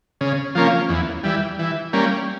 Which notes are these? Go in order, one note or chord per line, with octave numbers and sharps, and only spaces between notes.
C#3
F3 A#3 C#4
E2
E3 G3
E3
G3 A#3 C#4